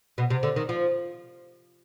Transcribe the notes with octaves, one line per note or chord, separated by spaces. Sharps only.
B2
C3
D3
D#3
F3